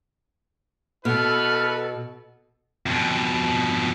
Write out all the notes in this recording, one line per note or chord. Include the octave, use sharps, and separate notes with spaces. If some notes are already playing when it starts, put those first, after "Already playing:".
B2 E4 F#4 A4 B4 F6
F2 B2